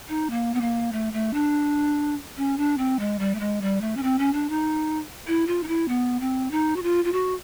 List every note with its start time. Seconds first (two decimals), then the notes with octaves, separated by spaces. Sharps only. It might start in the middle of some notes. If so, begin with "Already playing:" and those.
0.09 D#4
0.30 A#3
0.54 B3
0.61 A#3
0.92 A3
1.13 A3
1.34 D4
2.37 C#4
2.58 D4
2.78 C4
2.99 G#3
3.19 G3
3.35 A3
3.40 G#3
3.62 G3
3.81 A3
3.97 C#4
4.03 C4
4.19 C#4
4.33 D4
4.49 D#4
5.27 E4
5.47 F4
5.63 D#4
5.68 E4
5.88 B3
6.20 C4
6.51 D#4
6.76 F#4
6.83 F4
7.05 F4
7.13 F#4